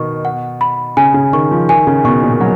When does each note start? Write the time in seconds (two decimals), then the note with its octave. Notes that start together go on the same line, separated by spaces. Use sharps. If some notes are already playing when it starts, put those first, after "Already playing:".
Already playing: B2 D#3 C#6
0.25 F#5
0.61 B5
0.97 C#3 G#5
1.14 C#3
1.33 D#3 C#6
1.51 F3
1.69 D#3 G#5
1.87 C#3
2.04 B2 C#6
2.22 A#2
2.40 F#3 F#5